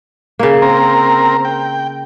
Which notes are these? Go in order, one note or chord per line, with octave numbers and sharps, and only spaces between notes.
C#3 A#3
C4 A#4
G5